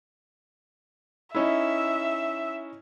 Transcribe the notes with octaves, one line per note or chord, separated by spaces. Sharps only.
C#4 D#4 E4 E5